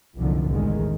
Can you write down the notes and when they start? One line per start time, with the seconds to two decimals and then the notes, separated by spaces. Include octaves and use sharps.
0.18 F#1 C2 F2 D3 D#3 F3
0.49 A1 E2 D#3 G#3